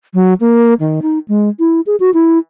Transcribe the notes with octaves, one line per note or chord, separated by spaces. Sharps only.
F#3
A#3
D#3
D#4
G#3
E4
G#4
F#4
E4